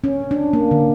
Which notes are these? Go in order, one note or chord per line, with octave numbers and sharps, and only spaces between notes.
C#4
D4
A#3
D3